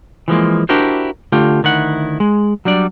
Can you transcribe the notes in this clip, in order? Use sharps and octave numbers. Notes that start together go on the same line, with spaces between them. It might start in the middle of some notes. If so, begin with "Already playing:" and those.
E3 F3 G#3 A#3
D4 E4 F#4 G4 A#4 C5
D3 A3 F4 G4
D2 D#3 E4 F#5
G#3
F#3 G3 D4 D5